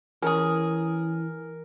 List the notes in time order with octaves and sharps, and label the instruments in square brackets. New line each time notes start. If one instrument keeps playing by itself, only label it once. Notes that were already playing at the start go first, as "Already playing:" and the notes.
[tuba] E3 [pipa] C#4 G#4 [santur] A#4